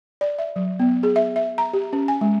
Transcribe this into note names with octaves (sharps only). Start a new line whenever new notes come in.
D5
E5
F#3
B3
G#4
E5
E5
A#5
G4
C#4
G#5
G#3